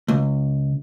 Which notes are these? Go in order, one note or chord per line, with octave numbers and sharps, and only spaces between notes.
C#2